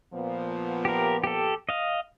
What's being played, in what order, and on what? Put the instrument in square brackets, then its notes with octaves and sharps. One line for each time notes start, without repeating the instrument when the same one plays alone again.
[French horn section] A#2 F3 B3
[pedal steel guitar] G4 A#4
G4 A4
D#5 F5